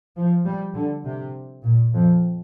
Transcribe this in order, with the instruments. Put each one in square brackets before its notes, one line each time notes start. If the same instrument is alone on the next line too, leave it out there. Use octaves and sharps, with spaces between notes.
[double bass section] F3
G3
D3
C3
A#2
F2